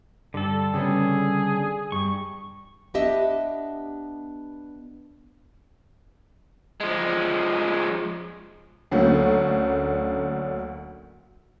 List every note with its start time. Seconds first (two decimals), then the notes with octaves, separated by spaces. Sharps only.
0.34 G2 D3 A4
0.74 C#3 G3 B3 G#4
1.92 G2 C#6
2.94 B3 D4 G4 D#5 E5
6.81 F3 G#3
8.91 D2 D3 F#3 A3 A#3 C#4